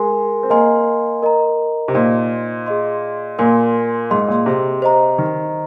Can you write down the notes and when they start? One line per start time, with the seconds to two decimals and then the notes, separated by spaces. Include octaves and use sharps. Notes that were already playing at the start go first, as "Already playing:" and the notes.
Already playing: G#3 A#4 G#5 C6
0.43 C4
0.49 A#3 A#4 D#5 G#5 C6
1.22 A#4 D#5 A#5
1.88 C3
1.94 A#2 D#4 C5 D#5 C6
2.66 G#4 D#5 C6
3.38 A#2 A#4 G#5 C6
4.10 G#2 G#4 D#5 C6
4.29 A#2
4.46 C3
4.82 C5 D#5 A#5
5.18 D#3